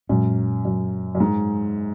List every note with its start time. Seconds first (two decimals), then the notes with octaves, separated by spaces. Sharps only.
0.09 F#2 A#2 G#3 C#4
0.65 F#2
1.15 F#2
1.20 G#2